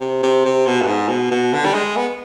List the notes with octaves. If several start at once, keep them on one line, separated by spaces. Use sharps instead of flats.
C3
C3
C3
B2
G2
G#2
B2
B2
D3
G3
G#3
B3